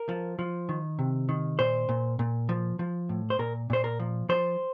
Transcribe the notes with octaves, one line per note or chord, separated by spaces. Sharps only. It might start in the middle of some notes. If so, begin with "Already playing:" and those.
Already playing: A#4
F3
F3
D#3
C3
D#3
A#2 C5
A#2
A#2
F3
F3
A2
C5
A#2 A#4
A#2 C5
A#4
F3
F3 C5